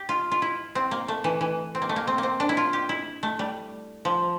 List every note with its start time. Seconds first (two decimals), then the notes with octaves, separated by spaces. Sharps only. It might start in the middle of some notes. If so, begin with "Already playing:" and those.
Already playing: G4
0.09 F4
0.31 F4
0.42 E4
0.75 C4
0.91 A#3
1.08 A3
1.24 E3
1.41 E3
1.75 C4
1.82 A#3
1.89 A3
1.96 A#3
2.07 C4
2.18 A#3
2.23 C4
2.40 D4
2.49 E4
2.57 F4
2.73 G4
2.89 E4
3.23 A3
3.39 G3
4.05 F3